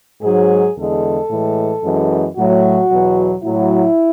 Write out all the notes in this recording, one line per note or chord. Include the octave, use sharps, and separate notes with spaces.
G#2 F#3 G#4
E2 D3 G#3 A4
A2 E3 G#3
F#2 E3 G#3
A2 F#3 F#4
E2 B2 F#3
A2 F#3 E4